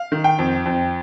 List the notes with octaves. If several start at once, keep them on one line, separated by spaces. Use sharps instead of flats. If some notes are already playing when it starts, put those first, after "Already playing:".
Already playing: F5
D#3
G5
F2
F2